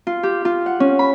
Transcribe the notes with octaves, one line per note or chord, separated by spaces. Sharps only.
F4
G4
F4
F#5
C#4
B5